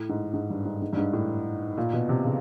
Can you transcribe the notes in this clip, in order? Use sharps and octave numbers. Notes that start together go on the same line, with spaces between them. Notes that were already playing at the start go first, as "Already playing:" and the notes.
Already playing: A2
G#2
G#2
G2
G#2
G#2
G2
G#2
A2
A#2
B2
C3
C#3